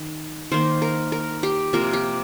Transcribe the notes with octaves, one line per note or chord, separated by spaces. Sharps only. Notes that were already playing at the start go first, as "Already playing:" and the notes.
Already playing: D#3
D#3 A#3 C5
A#4
A#4
G4
C3 F3 A#3 A#4
G4